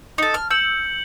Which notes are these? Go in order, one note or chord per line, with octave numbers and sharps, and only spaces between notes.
D#4 A4
F6
E6 G6 C#7 F#7